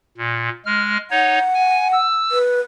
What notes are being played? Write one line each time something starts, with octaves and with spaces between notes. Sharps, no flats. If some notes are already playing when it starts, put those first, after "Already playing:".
A#2
G#3 F6
D#4 C#5 F#5
G#5
E6
B4